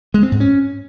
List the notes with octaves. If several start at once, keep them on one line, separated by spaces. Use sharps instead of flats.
G#3
C4
G#2
C#4